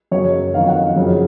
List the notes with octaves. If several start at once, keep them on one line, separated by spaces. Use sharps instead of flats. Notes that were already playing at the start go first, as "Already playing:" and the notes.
F#2 C#3 F#3 C#5
F2 D#3 F#3 F5
F#5
F#2 C#3 F3